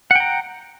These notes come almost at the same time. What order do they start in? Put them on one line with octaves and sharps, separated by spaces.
F#5 G5 A#5